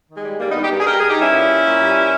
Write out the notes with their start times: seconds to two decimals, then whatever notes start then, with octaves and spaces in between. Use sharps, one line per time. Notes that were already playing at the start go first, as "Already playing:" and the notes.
0.09 D#3
0.17 G#3
0.24 G3
0.40 G2 G3 A#3
0.51 B3 D#4
0.55 G2
0.63 D#4 G4
0.71 G2
0.80 G#4
0.86 G2 G4 A#4
0.99 G2 G#4
1.10 D#4 G4
1.18 G2 C#4 E4
1.33 A#2
1.48 A#2
1.64 A#2
1.80 G3
1.95 A#2